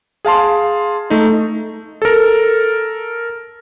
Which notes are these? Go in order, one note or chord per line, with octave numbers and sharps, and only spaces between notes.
G#4 F5 A5 C6
A3 D#4
A4 A#4